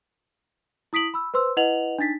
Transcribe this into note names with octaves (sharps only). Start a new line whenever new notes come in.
E4 D#6 B6 D7 F#7
B5 E6
B4 C5 C6 E6
E4 B4 D#5 F#5 F7 F#7
D4 D#4 A6 B6